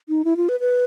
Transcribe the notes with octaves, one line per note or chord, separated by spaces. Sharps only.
D#4
E4
F4
B4
B4